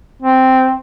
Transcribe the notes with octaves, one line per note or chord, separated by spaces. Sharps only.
C4